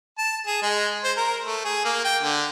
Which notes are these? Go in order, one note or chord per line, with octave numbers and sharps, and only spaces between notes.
A5
G#4
G#3
C5
A#4
A3
G#4
A#3
G5
D3